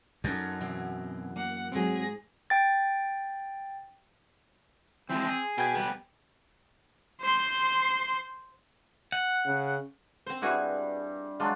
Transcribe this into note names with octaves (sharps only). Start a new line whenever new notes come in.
F#2 D#4 A4
B2 E3 C4
A#3 F#5
G#2 F#3 C4 G#4 A#6
G5 A6
E3 F3 G#3 C4
G#4
B2 G4 G#5
G3 B3
C5 C6
F#5
C#3
C4 C5
G2 E4 F#4 G#4
F#3 G#3 D4 F4